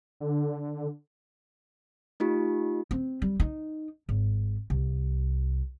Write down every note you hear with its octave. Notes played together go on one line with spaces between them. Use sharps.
D3
A3 D#4 F4 G4
C4
G3
D#4
G#1
C2